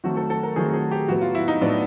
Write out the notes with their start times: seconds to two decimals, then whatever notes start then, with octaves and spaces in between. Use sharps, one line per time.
0.04 D#3 F#3 A3 C4 F#4
0.17 A4
0.30 A4
0.43 A#4
0.56 D#3 F#3 A3 C4 G#4
0.74 G#4
0.91 G4
1.08 A2 F#3 B3 F#4
1.21 F4
1.35 E4
1.48 D#4
1.61 A2 F#3 B3 D4